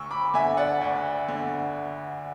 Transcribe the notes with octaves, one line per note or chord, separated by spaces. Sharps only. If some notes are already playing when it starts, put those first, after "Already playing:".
Already playing: D2 C#6 E6
B5 D6
D3 E5 G#5
D5 F#5
D2
D3